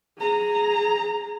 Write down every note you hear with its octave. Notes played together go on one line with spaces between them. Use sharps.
G#4 A#5